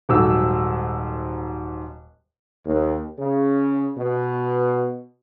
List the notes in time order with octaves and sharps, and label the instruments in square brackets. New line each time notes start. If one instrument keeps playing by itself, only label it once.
[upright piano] D#1 G#2 F#3 A4 E6
[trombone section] D#2
C#3
B2